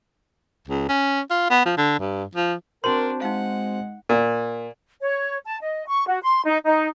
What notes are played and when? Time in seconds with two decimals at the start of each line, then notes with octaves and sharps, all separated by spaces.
0.68 C#2
0.89 C#4
1.31 F4
1.50 B3
1.66 F3
1.78 D3
1.99 G2
2.35 F3
2.84 C4 D4 F#4 A#4 C5 C6
3.22 G#3 D#4 F5 F#5
4.09 A#2
5.01 C#5
5.46 A5
5.62 D#5
5.88 C#6
6.08 F#4
6.22 C6
6.46 D#4
6.65 D#4